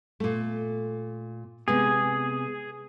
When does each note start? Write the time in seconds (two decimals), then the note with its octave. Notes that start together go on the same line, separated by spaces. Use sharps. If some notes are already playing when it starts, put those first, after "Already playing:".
0.20 A#2 A3
1.68 C3 G#3 B3 G#4